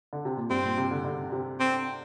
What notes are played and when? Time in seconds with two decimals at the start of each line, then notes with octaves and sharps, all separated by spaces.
0.13 D3
0.25 C3
0.37 A#2
0.50 G2 C4
0.64 A#2
0.78 C3
0.91 D3
1.05 D3
1.32 C3
1.60 C4